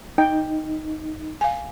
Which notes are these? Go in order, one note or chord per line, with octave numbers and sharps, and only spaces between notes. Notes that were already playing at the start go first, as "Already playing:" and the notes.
D#4 G5
F5 G#5